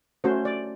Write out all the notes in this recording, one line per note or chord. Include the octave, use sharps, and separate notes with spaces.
A3 C#4 F#4 C5
D5